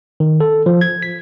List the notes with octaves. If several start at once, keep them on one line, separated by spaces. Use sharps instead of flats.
D#3
A4
F3
G#6
B6